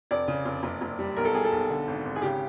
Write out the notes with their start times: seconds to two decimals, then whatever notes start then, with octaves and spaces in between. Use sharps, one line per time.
0.11 F1 D5
0.28 C#3
0.45 F1
0.63 F#1
0.81 F#1
0.99 G3
1.16 B1 A#4
1.25 A4
1.35 G3 G#4
1.44 A4
1.52 B1
1.70 D3
1.87 G#1
2.05 G#1
2.16 G#4
2.22 C#3 G4